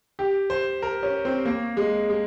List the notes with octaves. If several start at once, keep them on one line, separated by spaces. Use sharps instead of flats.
G4
C5
A#4
C#4
C4
A#3
G#3
G#3